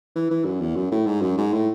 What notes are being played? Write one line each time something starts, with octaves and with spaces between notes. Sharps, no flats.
E3
E3
F#2
E2
F#2
A2
G#2
F#2
G#2
A2